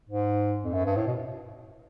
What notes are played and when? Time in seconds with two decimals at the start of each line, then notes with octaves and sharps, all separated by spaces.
0.09 G#2
0.64 F2
0.73 F#2
0.85 G2
0.96 A2
1.06 B2